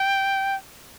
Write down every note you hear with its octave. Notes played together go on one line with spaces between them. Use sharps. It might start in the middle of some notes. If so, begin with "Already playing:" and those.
Already playing: G5